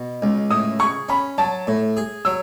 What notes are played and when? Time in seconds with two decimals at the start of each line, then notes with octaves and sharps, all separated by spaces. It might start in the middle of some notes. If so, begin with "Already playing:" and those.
Already playing: B2
0.22 C#2
0.50 A2 D#6
0.80 G#4 C#6
1.09 C#4 B5
1.38 F#3 A5
1.67 A2
1.97 G#4
2.25 F#3 E6